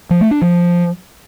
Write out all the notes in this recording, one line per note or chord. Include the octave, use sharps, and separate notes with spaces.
F3
A3
D4
F3